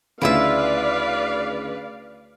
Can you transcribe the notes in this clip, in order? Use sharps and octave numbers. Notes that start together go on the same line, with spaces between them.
D2 C#3 E4 F4 B4 D5 E5 F5